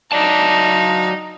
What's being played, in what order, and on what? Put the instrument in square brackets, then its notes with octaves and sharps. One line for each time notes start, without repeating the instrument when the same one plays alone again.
[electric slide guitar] F#3 D5 A5 [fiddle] D#4